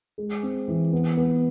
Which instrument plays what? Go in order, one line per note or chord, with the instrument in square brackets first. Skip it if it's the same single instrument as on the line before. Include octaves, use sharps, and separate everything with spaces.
[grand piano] G#3
C4
E3
B3
B3